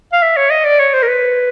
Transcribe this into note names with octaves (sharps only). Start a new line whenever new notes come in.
F5
E5
C#5
D#5
D5
C#5
C5
A#4
B4